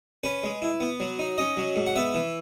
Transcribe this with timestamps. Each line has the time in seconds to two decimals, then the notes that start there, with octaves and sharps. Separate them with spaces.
0.24 C#4 B4
0.43 G#3
0.62 E4
0.80 B3
1.00 F#3
1.19 D#4
1.38 C#4 D#5
1.57 F#3
1.76 G#2
1.86 F#5
1.96 B3 E5
2.14 E3